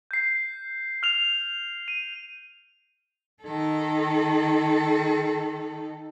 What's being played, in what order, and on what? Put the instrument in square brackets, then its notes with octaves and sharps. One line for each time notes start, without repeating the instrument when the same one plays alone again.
[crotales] G6 C7
F6 F7
D#7
[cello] D#3 A4